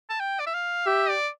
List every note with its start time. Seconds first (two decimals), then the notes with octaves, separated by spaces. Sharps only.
0.10 A5
0.20 G5
0.40 D5
0.46 E5
0.54 F5
0.86 G4 E5
1.09 D5